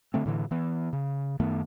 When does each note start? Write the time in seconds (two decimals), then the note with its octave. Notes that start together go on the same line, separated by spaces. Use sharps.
0.14 D3 A3 C4
0.25 A2 D3 E3
0.51 E3 B3
0.93 C#3
1.39 F#2 D#3 A3 B3